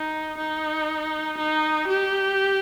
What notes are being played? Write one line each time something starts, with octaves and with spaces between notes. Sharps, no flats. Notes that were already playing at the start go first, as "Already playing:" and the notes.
Already playing: D#4
D#4
D#4
G4